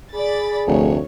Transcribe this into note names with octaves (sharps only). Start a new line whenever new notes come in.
G#4 D5 B5 A6
F1 D2 C#5